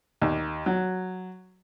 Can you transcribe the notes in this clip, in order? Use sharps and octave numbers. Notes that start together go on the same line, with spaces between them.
D#2
F#3